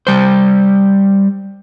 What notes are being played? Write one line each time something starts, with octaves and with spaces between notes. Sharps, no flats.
G3 C5